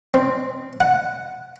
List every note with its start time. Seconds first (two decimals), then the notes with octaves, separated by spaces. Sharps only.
0.14 C4
0.80 F#5